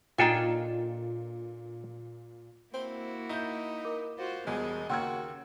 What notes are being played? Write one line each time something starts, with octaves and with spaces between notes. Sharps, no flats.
A#2 D4 D#4 F4 A4 G5 G#5
A#3 C4 E4 F#4
D#4 E5 G6
A#4 D6
F4 F#4 C5
E1 E2 G3 G#3 G#4
D#2 C#3 F#4 A#4 G5 C6 E6 G#6